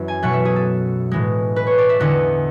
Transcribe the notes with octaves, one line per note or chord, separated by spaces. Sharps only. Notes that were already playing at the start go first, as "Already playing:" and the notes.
Already playing: F#2 E3 E5
G#5
B2 F#3 A3 F#5
E5
G#4
A4
A2 E3 G#3
B4
C#5
D5
E5
E2 D3 G#3 F#5